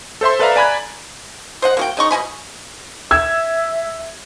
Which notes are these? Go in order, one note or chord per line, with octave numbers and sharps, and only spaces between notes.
A4 C5 E5 C6
A4 B4 D5 E5 F5 A#5
D5 G#5 A#5 B5 F#6 G#6
C5 D#5 F#5
A#3 F#4 G5
C#3 D#4 C#6
B2 D#5 G#5 B5
E5 E6 G#6